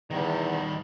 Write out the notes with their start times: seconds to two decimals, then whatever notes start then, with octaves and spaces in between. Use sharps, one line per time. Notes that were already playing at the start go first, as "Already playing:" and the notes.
0.11 E2 D#3 G3